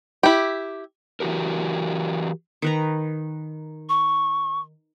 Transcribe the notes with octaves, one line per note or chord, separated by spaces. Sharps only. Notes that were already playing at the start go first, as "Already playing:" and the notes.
E4 G4
E3 F#4 G4 A#4
D#3 B4 A#5
C#6